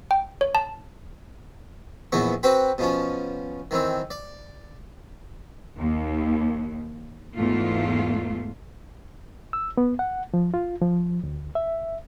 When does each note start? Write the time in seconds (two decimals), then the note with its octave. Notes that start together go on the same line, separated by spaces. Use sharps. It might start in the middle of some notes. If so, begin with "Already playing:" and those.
0.11 G5
0.41 C#5
0.55 A5
2.12 A#1 E2 E3 B3 C#6
2.43 C4 F#4 B4 G5 B5
2.78 B2 F3 C#4
3.71 D#3 E3 C4
4.10 D5
5.78 D#2
7.34 E2 G#2 A3 F4
9.53 E6
9.77 B3
9.99 F#5
10.34 F3
10.54 F4
10.82 F3
11.23 D2
11.55 E5